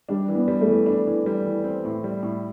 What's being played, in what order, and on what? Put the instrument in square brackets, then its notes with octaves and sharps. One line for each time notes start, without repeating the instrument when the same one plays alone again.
[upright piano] G3 [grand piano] D4
[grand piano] E3
[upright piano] B3
[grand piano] G3
[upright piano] A3
[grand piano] E3
D4
E3
G3
E3
C4
A2
G3
A2